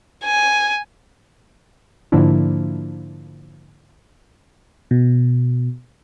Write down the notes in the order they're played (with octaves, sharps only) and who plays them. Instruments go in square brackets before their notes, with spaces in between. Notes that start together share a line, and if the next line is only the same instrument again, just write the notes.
[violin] G#5
[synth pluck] G#2 D3 F3 A#3 D4 E4
[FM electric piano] B2